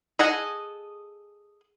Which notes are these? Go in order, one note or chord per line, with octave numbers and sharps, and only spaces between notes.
G#4 A4 D#5 F#5 G#5